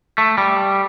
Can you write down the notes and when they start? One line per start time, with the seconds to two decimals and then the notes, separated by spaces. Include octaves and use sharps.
0.18 A3
0.38 G3